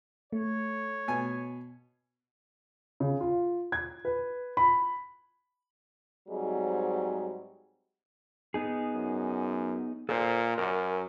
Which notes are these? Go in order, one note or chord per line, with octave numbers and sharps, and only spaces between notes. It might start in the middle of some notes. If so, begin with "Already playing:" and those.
A3 C#5
B2 G#5
C#3
F4
G#6
B4
B5
G#2 F#3 G3 C4 G#4 D#5
B3 D#4 G#4
F#2
A#2 A4 C5
F#2 A#4